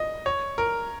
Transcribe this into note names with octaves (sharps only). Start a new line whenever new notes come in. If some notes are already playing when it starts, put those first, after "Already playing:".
Already playing: D#5
C#5
A#4